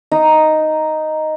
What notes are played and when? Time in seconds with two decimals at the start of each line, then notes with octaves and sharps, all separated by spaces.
0.12 D#4